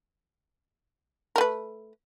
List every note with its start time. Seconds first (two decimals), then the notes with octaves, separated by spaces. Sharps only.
1.36 A#4
1.38 A3
1.41 B4